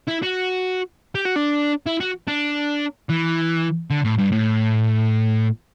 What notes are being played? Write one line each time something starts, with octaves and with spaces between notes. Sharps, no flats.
E4
F#4
G4
F#4
D4
E4
F#4
D4
E3
D3
A2
G2
A2